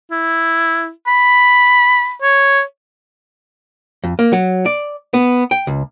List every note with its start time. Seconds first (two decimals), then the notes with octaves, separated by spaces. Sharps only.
0.11 E4
1.07 B5
2.22 C#5
4.04 F2
4.19 A#3
4.33 F#3
4.66 D5
5.14 B3
5.51 G5
5.67 C#2